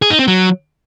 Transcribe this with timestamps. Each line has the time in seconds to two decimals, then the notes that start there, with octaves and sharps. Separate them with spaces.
0.02 G#4
0.10 D#4
0.19 C4
0.28 F#3